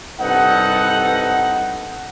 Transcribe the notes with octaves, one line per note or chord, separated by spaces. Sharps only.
C2 G2 D#4 A4 B4 F#5